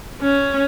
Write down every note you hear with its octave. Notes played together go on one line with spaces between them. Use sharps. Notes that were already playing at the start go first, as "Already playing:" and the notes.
C#4